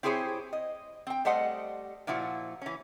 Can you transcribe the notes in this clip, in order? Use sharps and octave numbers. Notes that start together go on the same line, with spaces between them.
C4 E4 G4 G#4 C5 C#5
D#5
C4 G5
G3 A3 C5 D#5 F#5
A#2 F3 E4 F#4
E3 C#4